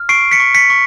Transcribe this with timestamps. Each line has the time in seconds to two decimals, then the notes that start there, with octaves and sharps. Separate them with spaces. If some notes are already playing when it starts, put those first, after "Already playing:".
Already playing: F6
0.09 C#6 C7 D7
0.31 B6 C#7
0.40 C#6
0.55 B6 C#7
0.70 C#6